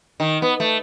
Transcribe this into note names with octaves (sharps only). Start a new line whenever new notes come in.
D#3
B3
A3